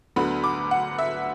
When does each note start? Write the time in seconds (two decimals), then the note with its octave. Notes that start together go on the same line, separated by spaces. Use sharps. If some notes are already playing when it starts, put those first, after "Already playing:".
0.16 D2 D3 F#3 B3 B5
0.44 D6
0.71 F#5
0.99 E5